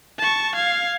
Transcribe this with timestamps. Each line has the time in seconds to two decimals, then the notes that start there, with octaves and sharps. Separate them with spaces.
0.18 A5 C#6
0.56 F5 G#6